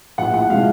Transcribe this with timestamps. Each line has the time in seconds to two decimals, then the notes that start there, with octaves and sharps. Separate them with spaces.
0.18 A#1 A2 F3 F#5
0.34 F#5
0.50 C3 F3 G#3 F5